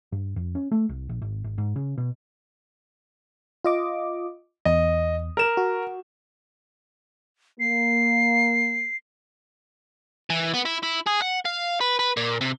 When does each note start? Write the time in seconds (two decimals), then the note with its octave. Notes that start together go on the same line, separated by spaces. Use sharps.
0.12 G2
0.36 F2
0.55 C#4
0.72 A3
0.89 C2
1.09 A#1
1.22 G#1
1.44 G#1
1.58 G#2
1.76 C#3
1.98 B2
3.64 F4 D#5 D6
4.65 E2 D#5
5.37 A#4 E7
5.57 F#4
7.60 A#3 C7
10.30 E3
10.54 B3
10.66 E4
10.83 E4
11.06 G#4
11.22 F#5
11.45 F5
11.81 B4
11.99 B4
12.17 A#2
12.41 C3